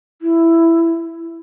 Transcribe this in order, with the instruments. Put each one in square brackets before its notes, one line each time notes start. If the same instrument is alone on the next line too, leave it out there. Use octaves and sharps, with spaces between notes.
[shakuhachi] E4